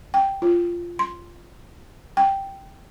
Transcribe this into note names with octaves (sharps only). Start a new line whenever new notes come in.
G5
F4
C6
G5